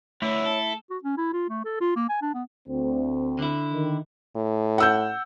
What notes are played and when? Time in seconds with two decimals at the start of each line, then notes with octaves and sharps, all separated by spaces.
0.22 D3 A3 B3 E4 C#5
0.46 A4
0.90 F#4
1.03 C#4
1.17 E4
1.33 F4
1.50 A3
1.65 A4
1.81 F4
1.96 A#3
2.09 G#5
2.22 D4
2.34 B3
2.68 D2 C4
3.39 D3 E4
3.72 D#3
4.36 A2
4.78 F#5 E6 G6